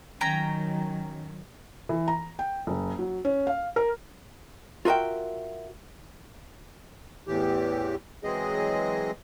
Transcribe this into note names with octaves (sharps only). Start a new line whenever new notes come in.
D#3 F#3 C#4 G5 A#5
E3
A#5
G5
F#1
F#3
C#4
F5
A#4
F4 F#4 A#4 D#5 E5 G5
E2 A2 E3 G4
E3 F#3 G#3 C4 G#4 D#5